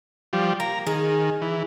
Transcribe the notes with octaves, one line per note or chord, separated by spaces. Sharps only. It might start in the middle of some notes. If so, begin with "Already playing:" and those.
F3 G3
A#3 A#5
D#3 G#4
E3